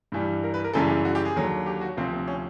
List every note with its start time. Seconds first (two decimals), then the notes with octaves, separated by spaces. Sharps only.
0.12 G2 E3 G3
0.44 A#4
0.54 B4
0.64 A#4
0.73 F#2 C#3 E3 G3 A4
0.90 G4
1.05 F#4
1.15 G4
1.25 G#4
1.36 D#2 D3 F#3
1.66 G4
1.81 F#4
1.97 D2 C3 F3 C4
2.13 C4
2.28 C#4